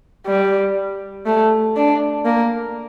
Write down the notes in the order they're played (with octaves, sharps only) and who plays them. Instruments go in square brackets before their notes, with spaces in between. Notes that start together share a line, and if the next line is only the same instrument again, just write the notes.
[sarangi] G3
A3
D4
A#3